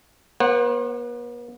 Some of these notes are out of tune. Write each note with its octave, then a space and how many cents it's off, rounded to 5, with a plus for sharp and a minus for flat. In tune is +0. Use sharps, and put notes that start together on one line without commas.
B3 -45 C5 +35 F#5 +0